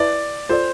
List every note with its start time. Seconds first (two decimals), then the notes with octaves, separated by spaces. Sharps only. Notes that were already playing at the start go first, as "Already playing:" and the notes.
Already playing: E4 B4 D5 E5 A5
0.49 F4 A4 C5 D5